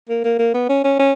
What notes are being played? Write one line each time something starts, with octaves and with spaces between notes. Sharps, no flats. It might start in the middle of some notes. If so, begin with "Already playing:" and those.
A#3
A#3
A#3
B3
C#4
C#4
C#4